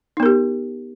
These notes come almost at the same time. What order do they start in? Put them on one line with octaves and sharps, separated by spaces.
D#4 B3 A#4 G4